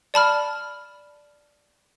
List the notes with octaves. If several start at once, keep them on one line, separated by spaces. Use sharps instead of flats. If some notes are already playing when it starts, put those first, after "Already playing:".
D5 A5 B5 F6